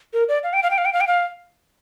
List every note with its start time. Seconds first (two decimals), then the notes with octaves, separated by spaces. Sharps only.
0.13 A#4
0.28 D5
0.43 F5
0.53 G5
0.63 F5
0.71 G5
0.78 F5
0.85 G5
0.93 F5
1.01 G5
1.07 F5